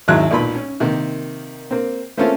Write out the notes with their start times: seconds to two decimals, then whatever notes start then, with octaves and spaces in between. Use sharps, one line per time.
0.08 G#1 D#2 F#3 G#3 E4 F#6
0.31 B1 A#2 B5
0.55 C#4
0.80 C3 D#3 A#3
1.71 A#3 C4
2.17 A3 A#3 C4 C#4 F4 A4